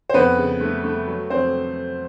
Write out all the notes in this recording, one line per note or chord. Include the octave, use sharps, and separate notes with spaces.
C5
F2 B3 B4
C#3
A3
A3
F#3
F2 C4 C5